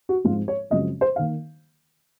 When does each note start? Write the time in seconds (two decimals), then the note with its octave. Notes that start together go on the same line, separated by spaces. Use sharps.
0.09 F#4
0.24 G#2 F3 G#3 C4 F4
0.48 C#5
0.70 F#2 C#3 F3 G#3 C4 D#5
1.01 C5
1.16 D#3 A#3 F5